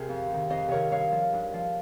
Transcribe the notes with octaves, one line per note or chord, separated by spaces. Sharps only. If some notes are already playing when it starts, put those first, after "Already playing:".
Already playing: C3 G#4 A#4 C5
F2
C3 D#3
F2 C5 D#5
C3 D#3 A#4 C#5
G2 C#5 F5
F3
G2
F3